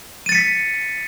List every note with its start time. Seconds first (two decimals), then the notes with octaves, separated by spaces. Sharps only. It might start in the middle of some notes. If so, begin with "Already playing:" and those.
0.26 D#7
0.29 A6
0.32 C#7
0.35 B6